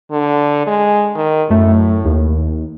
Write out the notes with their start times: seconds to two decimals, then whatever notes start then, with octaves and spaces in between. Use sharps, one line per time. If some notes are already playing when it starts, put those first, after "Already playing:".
0.11 D3
0.67 G#3
1.15 D#3
1.50 F#2 A2 A3
2.05 D#2